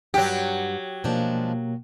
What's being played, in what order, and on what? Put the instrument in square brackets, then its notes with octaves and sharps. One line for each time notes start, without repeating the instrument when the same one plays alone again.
[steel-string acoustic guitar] G2 F#5 [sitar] F#3 G4
[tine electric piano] B2 A#3 [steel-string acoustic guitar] F3 G#3 D4